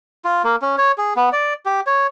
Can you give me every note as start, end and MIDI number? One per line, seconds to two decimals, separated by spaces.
0.25 0.42 65
0.44 0.56 58
0.62 0.76 61
0.78 0.92 73
0.98 1.14 68
1.16 1.29 59
1.32 1.54 74
1.66 1.81 67
1.87 2.07 73